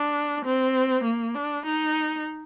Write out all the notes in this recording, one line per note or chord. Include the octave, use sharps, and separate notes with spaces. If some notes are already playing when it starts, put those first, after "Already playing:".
Already playing: D4
C4
A#3
D4
D#4